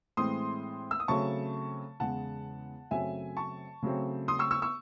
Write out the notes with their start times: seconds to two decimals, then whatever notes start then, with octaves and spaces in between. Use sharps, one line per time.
0.17 A2 E3 G#3 C4 C6 D#6
0.91 E6
1.00 D#6
1.08 C#3 F#3 A3 C4 A5 C#6
2.00 E2 C#3 G#3 F#5 A5
2.91 F#2 C#3 F#3 A3 C4 E5 G#5
3.37 A5 C#6
3.83 C#3 F#3 A3 C4
4.28 C6 D#6
4.39 C#6 E6
4.51 C#6 E6
4.62 C#6 E6